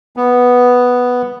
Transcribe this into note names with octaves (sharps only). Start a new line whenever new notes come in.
B3